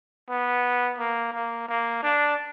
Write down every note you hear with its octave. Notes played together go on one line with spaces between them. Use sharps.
B3
A#3
A#3
A#3
D4